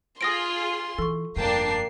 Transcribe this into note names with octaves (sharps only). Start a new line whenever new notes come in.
F4 G#4 C6 D#6 A#6 D7
E3 A4 C#6
F1 G2 A#3 D4 G5 A5 C7